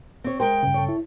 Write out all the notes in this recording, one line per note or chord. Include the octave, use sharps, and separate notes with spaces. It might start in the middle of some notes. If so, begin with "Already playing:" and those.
C4 C#5
G#3 A#4 C5 G5
G2 C#3
A4 C#5
E4